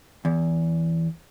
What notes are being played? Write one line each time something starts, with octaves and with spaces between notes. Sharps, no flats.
E2